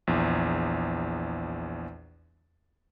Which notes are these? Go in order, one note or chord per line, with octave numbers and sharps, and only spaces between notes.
A#1 E2